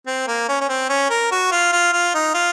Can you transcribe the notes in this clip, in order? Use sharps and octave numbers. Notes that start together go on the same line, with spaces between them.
C4
A#3
C#4
C#4
C4
C#4
A#4
F#4
F4
F4
F4
D#4
F4